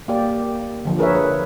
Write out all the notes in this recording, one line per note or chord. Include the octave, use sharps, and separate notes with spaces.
A#3 G4 D5
D3 F3
G#4 A#4 B4 C#5 E5
B4